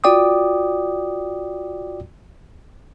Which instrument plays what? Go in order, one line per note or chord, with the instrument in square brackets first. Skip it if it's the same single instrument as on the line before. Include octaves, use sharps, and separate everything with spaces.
[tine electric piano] F4 F#4 D5 G5 D6 D#6